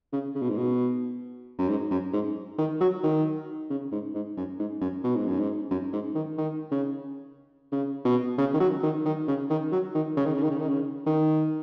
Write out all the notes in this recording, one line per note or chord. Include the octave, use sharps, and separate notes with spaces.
C#3
C#3
B2
G#2
B2
F#2
G#2
F#2
G#2
D#3
F#3
D#3
C#3
G#2
G#2
F#2
G#2
F#2
B2
G#2
F#2
G#2
F#2
G#2
D#3
D#3
C#3
C#3
B2
C#3
D#3
F#3
D#3
D#3
C#3
D#3
F#3
D#3
C#3
D#3
C#3
D#3
C#3
D#3
C#3
D#3